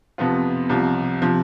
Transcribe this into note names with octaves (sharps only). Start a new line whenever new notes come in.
F2 C3 F3 B3 F4
C2 C3 F3
C3 F3